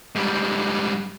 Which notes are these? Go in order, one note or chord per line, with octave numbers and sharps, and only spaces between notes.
G#2 G3